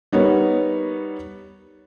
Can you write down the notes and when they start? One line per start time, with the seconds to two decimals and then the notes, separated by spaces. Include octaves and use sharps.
0.12 G3 B3 D#4 A#4 C#5